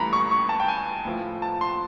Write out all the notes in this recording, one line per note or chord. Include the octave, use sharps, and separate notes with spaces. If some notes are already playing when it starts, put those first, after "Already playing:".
Already playing: G2 E3 A3 A#5 B5
C#6
C#6
A5
G5
G#5
A2 F3 A3
A5
C6